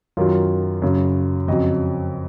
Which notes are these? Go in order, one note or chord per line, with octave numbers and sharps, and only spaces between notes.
F#2 D#3 F#3 F4
F#2 C#3 F#3
F2 C#3 F#3 D#5